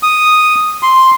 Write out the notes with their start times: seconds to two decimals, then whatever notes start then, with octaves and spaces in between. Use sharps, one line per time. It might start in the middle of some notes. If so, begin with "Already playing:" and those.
0.03 D#6
0.83 C6